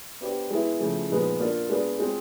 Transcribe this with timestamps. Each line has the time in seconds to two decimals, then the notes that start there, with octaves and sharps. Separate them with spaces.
0.21 B3 D4 G4 C5
0.51 G#3 B3 E4
0.80 C#3 F3 A3
1.10 A#2 F3 G#3 B3 D#4
1.40 A#3 D4 F4
1.70 G#3 B3 D4
1.99 G#3 C4 F4